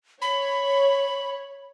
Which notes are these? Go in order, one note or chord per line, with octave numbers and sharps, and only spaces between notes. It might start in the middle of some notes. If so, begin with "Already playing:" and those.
C#5 B5